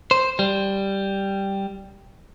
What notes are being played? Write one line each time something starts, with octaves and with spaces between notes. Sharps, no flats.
C5
G3